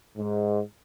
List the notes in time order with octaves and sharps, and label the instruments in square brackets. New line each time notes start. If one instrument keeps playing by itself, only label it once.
[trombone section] G#2